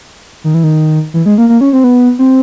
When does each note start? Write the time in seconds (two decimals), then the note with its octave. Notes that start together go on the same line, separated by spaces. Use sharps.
0.44 D#3
0.54 E3
0.64 D#3
1.14 E3
1.26 G#3
1.38 A#3
1.49 A#3
1.61 C#4
1.73 C4
1.84 B3
2.19 C4